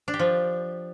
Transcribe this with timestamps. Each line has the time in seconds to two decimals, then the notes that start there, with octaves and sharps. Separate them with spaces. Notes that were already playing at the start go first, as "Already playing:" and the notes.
0.08 D4
0.14 G4
0.19 F3